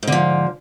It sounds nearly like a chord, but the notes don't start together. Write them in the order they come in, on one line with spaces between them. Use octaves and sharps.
G#2 D3 F3